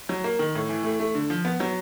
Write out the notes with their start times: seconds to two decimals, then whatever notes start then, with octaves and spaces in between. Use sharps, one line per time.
0.09 F#3
0.24 A#3
0.39 D#3
0.55 A2
0.69 E3
0.84 A3
1.00 A3
1.15 D3
1.30 F3
1.45 B3
1.60 F#3